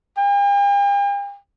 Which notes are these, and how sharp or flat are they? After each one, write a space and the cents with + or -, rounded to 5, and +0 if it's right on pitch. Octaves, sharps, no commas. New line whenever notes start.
G5 +45